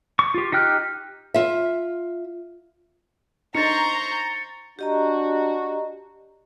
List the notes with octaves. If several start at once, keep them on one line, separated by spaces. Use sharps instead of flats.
C#6
F4 G4
D#4 G4 G5 F6 F#6
F4 E5
D4 D#4 C5 A#5 C#6 G6 A6 C#7
D4 F#4 G4 D#5 A#5